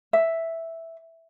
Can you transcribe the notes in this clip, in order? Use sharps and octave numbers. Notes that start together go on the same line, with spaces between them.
E5